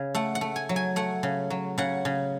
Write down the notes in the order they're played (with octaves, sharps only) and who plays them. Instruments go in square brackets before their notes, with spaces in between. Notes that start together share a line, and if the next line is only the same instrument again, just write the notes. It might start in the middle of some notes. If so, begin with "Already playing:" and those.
Already playing: [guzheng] C#3
A3 F#5
F#5
A3
G#5
F#3
G#5
A3 F#5
C#3
F#3
C#3 F#5
C#3